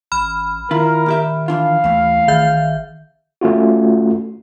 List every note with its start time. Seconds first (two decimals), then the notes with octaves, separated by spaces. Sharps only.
0.12 A1 B5 F6
0.71 D#3 E4 F4 A#4
1.06 A#2 G4 E5
1.48 E3 D4 F4 F5
1.84 D#2 E3 A3
2.28 G#1 D#3 E5 G6
3.41 A3 C#4 F4 F#4